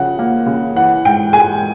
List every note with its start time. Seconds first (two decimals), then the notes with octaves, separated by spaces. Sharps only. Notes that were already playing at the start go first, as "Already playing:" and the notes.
Already playing: C#3 F3 F#5
0.19 A#3
0.46 C#3
0.76 E3 F#5
1.05 G#2 G5
1.33 G#3 G#5